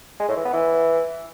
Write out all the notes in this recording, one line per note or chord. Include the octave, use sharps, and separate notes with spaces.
G#3
A2
E3
B3
E3